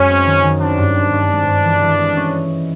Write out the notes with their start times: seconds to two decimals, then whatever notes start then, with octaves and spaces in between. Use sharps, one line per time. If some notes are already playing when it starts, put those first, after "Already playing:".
Already playing: F#2 G#3 C#4
0.09 C4
0.26 D#3
0.44 D#3
0.60 C4 D4
0.78 G2
0.95 C4
1.12 G2
1.30 G#3
1.47 G2
1.64 E3
1.82 E3
1.99 G#3
2.17 C#4